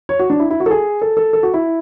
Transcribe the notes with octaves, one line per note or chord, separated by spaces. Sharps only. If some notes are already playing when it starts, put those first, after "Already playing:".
C#5
F#4
D4
E4
E4
F#4
A4
G#4
A4
A4
A4
F#4
E4